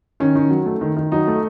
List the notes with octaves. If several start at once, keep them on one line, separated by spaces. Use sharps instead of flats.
D#3 C#4
D#3
F#3
A3
D#3
D#3
F#3 D#4
A3